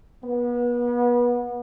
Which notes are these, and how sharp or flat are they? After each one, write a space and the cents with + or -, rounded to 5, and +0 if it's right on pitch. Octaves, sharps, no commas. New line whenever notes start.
B3 -30